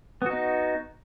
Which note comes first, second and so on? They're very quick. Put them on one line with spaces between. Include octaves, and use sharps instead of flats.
B3 F#4 D#4